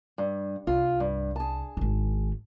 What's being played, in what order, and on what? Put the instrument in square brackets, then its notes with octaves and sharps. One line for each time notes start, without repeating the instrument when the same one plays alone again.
[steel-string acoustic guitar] G2
[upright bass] C2 [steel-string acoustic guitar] F4
[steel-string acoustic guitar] G2
G#4 A5
[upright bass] G#1 D#3